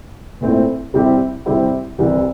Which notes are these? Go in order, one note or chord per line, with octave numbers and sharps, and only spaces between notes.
A#2 A3 C4 E4
C3 G3 C4 E4 G4
C3 G3 C4 E4 G4
C2 C3 E3